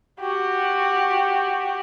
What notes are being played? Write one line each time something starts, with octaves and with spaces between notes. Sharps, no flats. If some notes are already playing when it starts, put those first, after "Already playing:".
F#4 G4